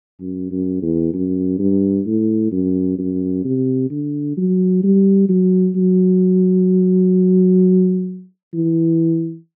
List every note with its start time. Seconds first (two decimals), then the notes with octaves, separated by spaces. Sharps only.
0.20 F#2
0.51 F#2
0.82 E2
1.13 F#2
1.59 G2
2.06 A2
2.52 F#2
2.98 F#2
3.45 C3
3.91 D3
4.37 F#3
4.83 G3
5.29 F#3
5.76 F#3
8.53 E3